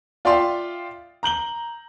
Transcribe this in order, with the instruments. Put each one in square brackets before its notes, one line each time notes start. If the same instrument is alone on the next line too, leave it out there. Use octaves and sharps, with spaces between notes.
[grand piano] F4 D5 E5 F5 G5 C6
A#5 G6 F#7 G7